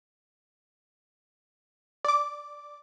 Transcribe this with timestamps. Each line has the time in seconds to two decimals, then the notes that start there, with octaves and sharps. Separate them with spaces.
2.04 D5 D6